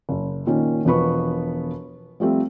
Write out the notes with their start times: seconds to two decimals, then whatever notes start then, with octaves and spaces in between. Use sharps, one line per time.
0.09 F#1
0.47 A#2 D#3 C#4
0.85 E1 B2 F3 B3 B5 C#6
2.20 F3 G3 A3 C4